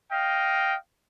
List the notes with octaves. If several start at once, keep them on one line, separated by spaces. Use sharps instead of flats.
D#5 F5 G5